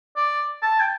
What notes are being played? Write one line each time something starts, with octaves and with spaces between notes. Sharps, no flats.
D5
A5
G5